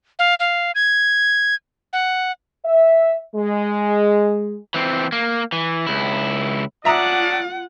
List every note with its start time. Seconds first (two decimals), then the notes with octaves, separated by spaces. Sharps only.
0.19 F5
0.40 F5
0.75 G#6
1.93 F#5
2.65 E5
3.35 G#3
4.74 E3 C4
5.12 A#3
5.52 E3
5.87 C#2 E4
6.85 C#4 D4 F4 D5 E5 F#5 A#5 D#6